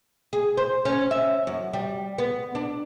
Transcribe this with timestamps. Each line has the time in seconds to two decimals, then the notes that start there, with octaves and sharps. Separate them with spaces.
0.33 G#4
0.57 C5
0.85 C#4
1.11 E5
1.47 F#2
1.73 G3
2.18 B3
2.55 D4